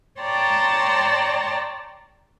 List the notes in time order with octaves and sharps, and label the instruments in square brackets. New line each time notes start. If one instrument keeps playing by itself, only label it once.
[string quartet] C#5 D5 G5 A5 A#5 C6